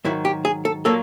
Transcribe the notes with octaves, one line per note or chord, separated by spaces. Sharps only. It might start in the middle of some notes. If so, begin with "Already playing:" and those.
G#2 D#3 F#3 E4
G4
G#4
A4
A#2 F#3 A#3 A4